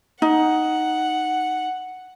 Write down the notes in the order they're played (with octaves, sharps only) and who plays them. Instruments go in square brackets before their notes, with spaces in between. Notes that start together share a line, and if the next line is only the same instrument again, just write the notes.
[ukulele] D#4 [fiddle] F#5